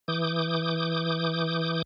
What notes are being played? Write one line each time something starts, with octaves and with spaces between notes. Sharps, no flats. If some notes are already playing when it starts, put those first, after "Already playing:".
E3 D6 D#6 G6